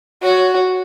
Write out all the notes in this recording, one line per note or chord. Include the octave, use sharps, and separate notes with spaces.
F#4 C#5